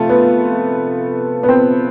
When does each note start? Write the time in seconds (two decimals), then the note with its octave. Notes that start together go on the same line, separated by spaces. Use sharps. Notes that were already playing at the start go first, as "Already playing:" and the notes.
Already playing: C3 F3 A3 F4
0.09 B3
1.43 B3
1.49 C4